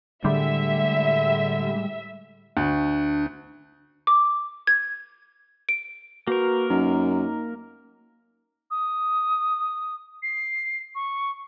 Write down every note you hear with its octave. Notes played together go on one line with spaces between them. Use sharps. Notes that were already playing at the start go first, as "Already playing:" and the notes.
A2 D3 G3 G#3 E5
D2 D4
D6
G#6
D7
A#3 F#4 A#4 B4
F#2 D#4
D#6
C7
C#6